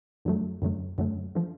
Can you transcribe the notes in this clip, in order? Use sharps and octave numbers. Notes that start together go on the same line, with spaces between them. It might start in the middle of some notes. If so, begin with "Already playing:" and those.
F#2 D3 F#3 A3
F#2 D3 F#3 A3
F#2 D3 F#3 A3
D3 F3